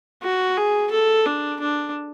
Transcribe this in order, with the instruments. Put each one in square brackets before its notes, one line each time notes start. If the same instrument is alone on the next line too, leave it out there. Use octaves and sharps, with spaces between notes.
[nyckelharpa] F#4
G#4
A4
D4
D4